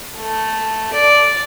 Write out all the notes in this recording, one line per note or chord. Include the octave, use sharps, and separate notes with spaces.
A3
D5